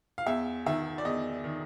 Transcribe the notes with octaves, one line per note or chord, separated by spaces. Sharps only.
F5
E2 E5
D#3 E5
D5
E2 D#5
D#3